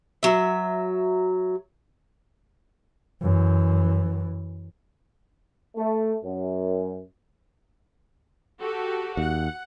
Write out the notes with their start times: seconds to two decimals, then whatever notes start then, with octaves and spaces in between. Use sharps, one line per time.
0.23 F#3 E5
3.22 F#2 E3
5.75 A3
6.24 F#2
8.60 F#4 G4 A4
9.17 D#2 F#5